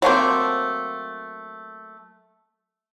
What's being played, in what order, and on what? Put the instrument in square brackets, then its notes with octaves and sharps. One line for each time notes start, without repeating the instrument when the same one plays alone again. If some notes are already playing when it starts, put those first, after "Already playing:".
[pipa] F#3 A3 A#3 C4